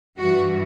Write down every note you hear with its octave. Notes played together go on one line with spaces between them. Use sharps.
G2 E3 F#4